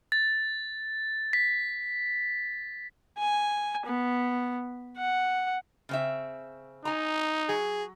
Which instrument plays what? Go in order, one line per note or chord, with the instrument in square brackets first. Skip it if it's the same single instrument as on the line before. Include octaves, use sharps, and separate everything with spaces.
[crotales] A6
B6
[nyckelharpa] G#5
B3
F#5
[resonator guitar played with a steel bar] C#3 C4 E5
[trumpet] D#4 [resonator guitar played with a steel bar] G#5 A#5
[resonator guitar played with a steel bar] F#3 [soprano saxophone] G#4